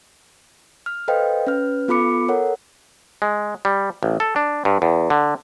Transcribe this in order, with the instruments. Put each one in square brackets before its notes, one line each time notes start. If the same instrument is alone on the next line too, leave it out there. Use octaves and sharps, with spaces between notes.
[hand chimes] F6
A4 B4 C5 D#5 F5 G5
C#4 B4 F6
B3 F4 A4 B5 D6 C#7
A4 A#4 C#5 F#5
[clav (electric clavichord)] G#3
G3
A1
A4
D4
G2
E2
D3